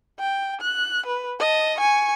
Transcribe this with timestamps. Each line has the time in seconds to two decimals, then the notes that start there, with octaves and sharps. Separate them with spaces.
0.20 G5
0.61 F#6
1.06 B4
1.40 D#5 A5
1.78 G#5 C#6